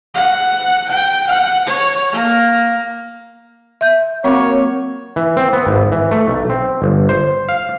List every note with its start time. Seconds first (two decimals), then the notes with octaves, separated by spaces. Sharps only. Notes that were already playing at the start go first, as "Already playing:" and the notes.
0.14 F#5
0.89 G5
1.27 F#5
1.67 C#5
2.12 A#3
3.81 E5 G6
4.24 F#3 A#3 C4 C#5
5.16 E3
5.37 C4
5.53 B3
5.67 G#1
5.92 E3
6.11 A3
6.28 B1
6.50 C4
6.82 G1
7.09 C5
7.49 F5